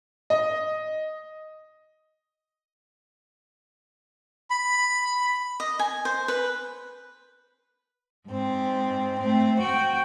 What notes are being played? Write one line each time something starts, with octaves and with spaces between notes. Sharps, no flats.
D#5
B5
D#5
G#5
C5
B4
G#2 C4
A3 C4
F#4 G5